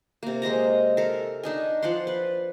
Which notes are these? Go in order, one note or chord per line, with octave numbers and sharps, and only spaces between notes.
C3 A#3
G#3 C5 D#5 A#5
A4 A#4
D4 D#4 G#5
F3 D5 F#5 C6
B4